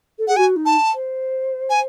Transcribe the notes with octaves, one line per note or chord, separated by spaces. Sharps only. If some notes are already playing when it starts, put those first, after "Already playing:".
A4
G#4 F#5
F#4 G#5
D#4
A5
C5
G#5